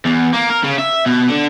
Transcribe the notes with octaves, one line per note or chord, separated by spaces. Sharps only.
E2
A#3
A#4
C#3
E5
B2
D3